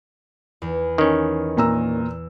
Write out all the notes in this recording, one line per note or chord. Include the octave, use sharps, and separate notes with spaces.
E2
D#3 C#4
A#2 A#5 E6